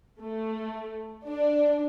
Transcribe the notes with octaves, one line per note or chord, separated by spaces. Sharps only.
A3
D4